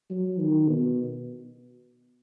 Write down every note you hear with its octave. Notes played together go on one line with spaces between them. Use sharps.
F#3
D#3
B2